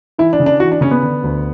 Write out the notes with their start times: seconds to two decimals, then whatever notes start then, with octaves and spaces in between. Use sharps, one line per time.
0.18 E3 E4
0.33 D4
0.40 C#3
0.46 D4
0.60 E3 F#4
0.71 D4
0.81 C#3 C#4
0.91 B3
1.03 D3
1.23 D2